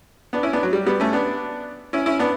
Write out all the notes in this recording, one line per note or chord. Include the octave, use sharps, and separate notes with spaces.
B3 D4
C#4 E4
B3 D4
F#3
G3
G3 B3
A3 C#4
B3 D4
C#4 E4
C#4 E4
B3 D4